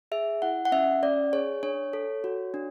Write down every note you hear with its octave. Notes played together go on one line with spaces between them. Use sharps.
G#4 E5
E4 F#5
F#5
C#4 E5
C#4 D5
G#4 C#5
D4 C#5
A4
F#4
D4